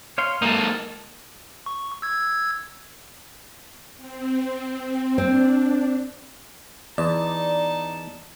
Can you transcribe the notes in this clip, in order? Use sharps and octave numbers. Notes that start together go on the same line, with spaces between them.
C#5 F5 C6
G#3 A#3 D#4 A#4 A5
C#6
E6 G#6
C4
C4 D4
E2 D#4 D5 A5